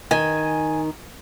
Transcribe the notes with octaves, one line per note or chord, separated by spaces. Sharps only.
D#3 G#5